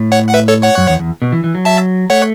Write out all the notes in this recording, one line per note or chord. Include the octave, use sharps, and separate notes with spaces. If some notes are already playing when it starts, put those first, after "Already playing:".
Already playing: A2
C#5 F#5
F#5
B4 E5
A4 C#5
C#5 F#5
F#2
E2
E2
B2
E3
E3
F#3
E5 A5
A3 C#5 F#5